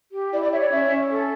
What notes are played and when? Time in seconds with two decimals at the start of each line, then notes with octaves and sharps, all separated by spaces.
0.12 G4
0.31 E4 D5
0.41 D5
0.51 C#5 E5
0.61 D5
0.71 C#4 E5
0.90 C#4
1.10 A4